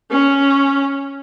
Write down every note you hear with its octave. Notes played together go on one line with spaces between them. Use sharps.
C#4